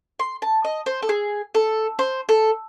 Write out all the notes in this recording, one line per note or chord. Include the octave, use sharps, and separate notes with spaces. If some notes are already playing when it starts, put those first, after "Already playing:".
C6
A5
D#5
C5
A4
G#4
A4
C5
A4